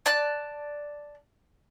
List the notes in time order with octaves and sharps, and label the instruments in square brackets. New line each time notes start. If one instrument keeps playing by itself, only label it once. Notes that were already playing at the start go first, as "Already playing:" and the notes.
[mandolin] D5 A5 F#6